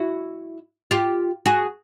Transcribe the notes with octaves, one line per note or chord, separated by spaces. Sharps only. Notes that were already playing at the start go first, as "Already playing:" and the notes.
Already playing: E4 F#4
F4 G4
F#4 G#4